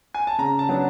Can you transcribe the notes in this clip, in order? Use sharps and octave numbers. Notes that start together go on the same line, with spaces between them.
G#5
A5
C#3 A#5
A5
F#3 B3 D4